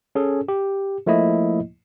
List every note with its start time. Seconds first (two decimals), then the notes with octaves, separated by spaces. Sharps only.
0.15 C#4 G#4 A4
0.48 G4
1.07 F3 A3 A#3 E4 D#5